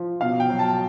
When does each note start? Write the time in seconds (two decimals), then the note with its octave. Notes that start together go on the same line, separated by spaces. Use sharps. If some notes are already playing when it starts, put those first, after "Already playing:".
Already playing: F3
0.21 B2 F5
0.40 G5
0.50 F#3
0.59 A5